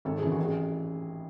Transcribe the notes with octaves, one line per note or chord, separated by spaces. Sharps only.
G#1 A4
F#2 E3 G#4
F#4
A1
G#4